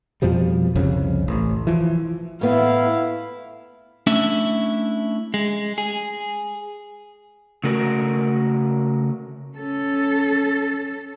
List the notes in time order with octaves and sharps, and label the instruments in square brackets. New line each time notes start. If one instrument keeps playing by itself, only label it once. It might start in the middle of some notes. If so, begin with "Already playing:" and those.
[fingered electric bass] F2 B2 F3 G3
C2 F2 C#3
A1
E3 F3
[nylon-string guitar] A2 B3 [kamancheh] E4 F5
[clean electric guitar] A3 C#4 D4 E4 E5
G#3
G#4
[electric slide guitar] C#3 A3 F#4 A#4
[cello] C#4 A4